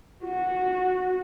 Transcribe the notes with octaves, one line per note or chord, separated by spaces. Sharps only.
F#4